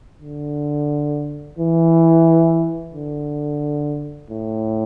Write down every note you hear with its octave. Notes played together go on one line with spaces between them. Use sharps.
D3
E3
D3
A2